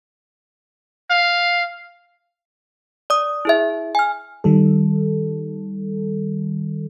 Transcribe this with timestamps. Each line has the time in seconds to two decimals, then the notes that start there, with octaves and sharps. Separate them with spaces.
1.10 F5
3.10 D5 D#6
3.45 E4 G#4 E5
3.95 G#5 F6
4.44 D#3 G3 A4